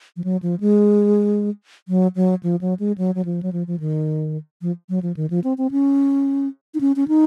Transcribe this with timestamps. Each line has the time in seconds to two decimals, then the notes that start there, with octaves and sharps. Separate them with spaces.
0.16 F3
0.24 F#3
0.42 F3
0.60 G#3
1.88 F#3
2.16 F#3
2.43 F3
2.61 F#3
2.79 G#3
2.98 F#3
3.15 F#3
3.25 F3
3.43 F#3
3.53 F3
3.67 F3
3.80 D#3
4.62 F3
4.89 F#3
5.03 F3
5.16 D#3
5.30 F3
5.44 C4
5.58 C4
5.71 C#4
6.74 D#4
6.81 C#4
6.96 C#4
7.08 D#4